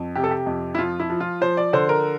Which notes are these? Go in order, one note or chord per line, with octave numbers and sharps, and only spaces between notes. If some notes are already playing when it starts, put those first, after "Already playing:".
Already playing: F2
C3 G4
A4
G4
F2
E4
F3 F4
E4
F3
F4
F3 C5
D5
D3 C5
A#4